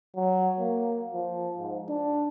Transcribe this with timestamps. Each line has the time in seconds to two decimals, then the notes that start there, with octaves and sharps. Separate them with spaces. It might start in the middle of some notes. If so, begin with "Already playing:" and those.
0.15 F#3
0.59 A#3
1.13 F3
1.57 G#2
1.89 D4